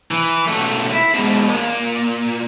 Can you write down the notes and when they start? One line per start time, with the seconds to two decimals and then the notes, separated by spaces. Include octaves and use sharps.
0.11 E3
0.48 B1 A3
0.94 E4
1.14 G#2 B2
1.49 A#2